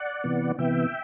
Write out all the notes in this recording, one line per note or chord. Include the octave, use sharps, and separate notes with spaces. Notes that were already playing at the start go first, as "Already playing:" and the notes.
Already playing: D5 F#5
C3 E3 B3
C3 E3 B3 E5 G5